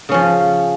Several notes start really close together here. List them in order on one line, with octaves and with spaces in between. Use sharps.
C#3 C#4 F3